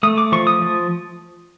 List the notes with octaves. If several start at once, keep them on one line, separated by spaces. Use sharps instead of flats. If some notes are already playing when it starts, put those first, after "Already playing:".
A3 D#6
D6
F3 C#6
D#6
F3